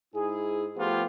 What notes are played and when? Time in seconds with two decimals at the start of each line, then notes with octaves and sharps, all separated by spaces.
0.14 G#2 E4 G#4
0.76 F3 A3 B3 F4 G4